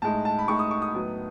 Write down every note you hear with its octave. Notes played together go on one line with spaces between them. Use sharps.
A2 G#3 D#4 A5
A5
B5
A2 G#3 D#4 C#6
D#6
C#6
D#6
A2 F#3 B3 D#4